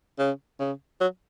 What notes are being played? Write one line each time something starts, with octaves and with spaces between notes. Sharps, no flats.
C#3
C#3
F#3